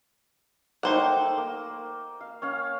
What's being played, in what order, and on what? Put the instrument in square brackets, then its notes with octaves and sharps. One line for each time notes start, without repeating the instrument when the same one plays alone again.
[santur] A3 A#3 G5 [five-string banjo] D#4 C5 F#5
[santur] A#3
F5
C#4 C#5 F5